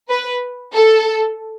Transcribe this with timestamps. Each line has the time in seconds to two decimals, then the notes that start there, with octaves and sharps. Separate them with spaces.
0.09 B4
0.73 A4